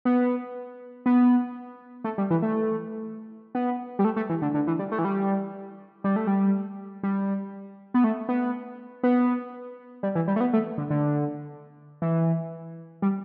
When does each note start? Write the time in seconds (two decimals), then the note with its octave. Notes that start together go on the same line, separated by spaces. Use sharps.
0.05 B3
1.06 B3
2.04 A3
2.18 G3
2.30 E3
2.42 A3
3.55 B3
3.99 G3
4.05 A3
4.16 A3
4.29 E3
4.42 D3
4.54 D3
4.67 E3
4.79 G3
4.92 A3
4.99 E3
5.05 G3
6.04 G3
6.16 A3
6.27 G3
7.03 G3
7.94 B3
8.04 A3
8.29 B3
9.03 B3
10.03 G3
10.15 E3
10.28 G3
10.36 A3
10.40 B3
10.53 A3
10.78 D3
10.90 D3
12.02 E3
13.02 G3